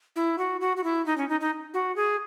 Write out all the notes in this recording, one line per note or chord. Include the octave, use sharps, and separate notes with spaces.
E4
F#4
F#4
F#4
E4
D#4
C#4
D#4
D#4
F#4
G#4